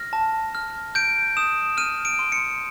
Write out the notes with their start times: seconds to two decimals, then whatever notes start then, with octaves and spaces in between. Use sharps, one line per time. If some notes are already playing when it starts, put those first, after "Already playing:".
Already playing: F6 A#6
0.13 A5
0.55 F6
0.95 G6 D7
1.37 D#6 E7
1.77 F6 D#7
2.05 D7
2.19 C6
2.32 C#7